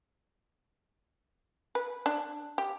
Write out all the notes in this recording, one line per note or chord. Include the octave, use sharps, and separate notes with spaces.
B4
D4
G4